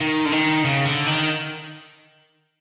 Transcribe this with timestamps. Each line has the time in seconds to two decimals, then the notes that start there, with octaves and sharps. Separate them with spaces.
0.01 D#3
0.25 D3
0.32 D#3
0.65 C#3
0.86 D3
1.07 D#3